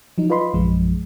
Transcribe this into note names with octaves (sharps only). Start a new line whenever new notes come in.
F3 F#3 D#4
F4 B4 D#5 B5 C6
A#1 F#2 F3 G#3